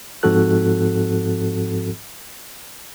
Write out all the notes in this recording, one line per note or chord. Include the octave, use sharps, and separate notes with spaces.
G#2 F3 C4 F#4 A4 F#6